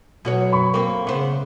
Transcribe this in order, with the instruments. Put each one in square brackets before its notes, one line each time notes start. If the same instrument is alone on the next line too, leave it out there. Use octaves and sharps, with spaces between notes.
[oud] B2 F#4 C#5 [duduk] F#3
[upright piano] B5 C#6
[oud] A#3 C4
[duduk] C#3 [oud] B3 C5